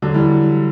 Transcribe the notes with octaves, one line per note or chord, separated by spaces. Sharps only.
D3 F#3
E3 G3